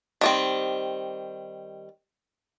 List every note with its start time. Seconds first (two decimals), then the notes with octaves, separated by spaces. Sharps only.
0.21 D#3 G3 C4